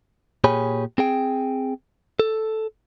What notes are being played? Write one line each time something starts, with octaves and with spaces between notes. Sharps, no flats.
A#2 G4 G#4 C#5 G#5 B5
C4 G#4 G5
A4